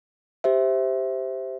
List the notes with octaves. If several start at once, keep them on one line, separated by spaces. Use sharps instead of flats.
G4 C5 E5